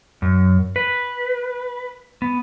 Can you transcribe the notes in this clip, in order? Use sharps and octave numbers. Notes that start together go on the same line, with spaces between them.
F#2
B4
B3